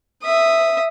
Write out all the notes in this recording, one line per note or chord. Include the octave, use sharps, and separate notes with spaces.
E5 D#6